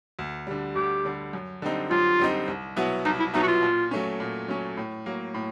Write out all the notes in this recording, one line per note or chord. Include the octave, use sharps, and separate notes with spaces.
D2
D3 G3
D2 G4
D3 G3
F#2
D3 G3 C4 D#4
F#2 F4
D3 G3 C4 D#4
C2
B2 F#3 B3 E4
C2 D#4
E4
B2 F#3 B3 D#4 E4
F#4
F4
A#2
F#3 A3 C#4
A#2
F#3 A3 C#4
A2
F#3 A#3
A2